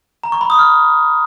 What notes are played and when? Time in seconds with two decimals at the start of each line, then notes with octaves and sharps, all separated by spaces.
0.23 A#5
0.32 C#6
0.41 B5
0.50 D#6
0.59 F6